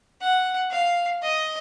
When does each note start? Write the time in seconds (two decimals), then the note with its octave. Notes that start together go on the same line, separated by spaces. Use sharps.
0.21 F#5
0.71 F5
1.22 D#5